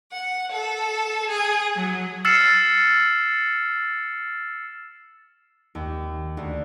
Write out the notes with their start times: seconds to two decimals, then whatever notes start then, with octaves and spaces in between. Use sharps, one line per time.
0.12 F#5
0.52 A4
1.30 G#4
1.75 F#3
2.25 E6 F6 A6 C7 C#7 E7
5.75 D#2
6.37 D2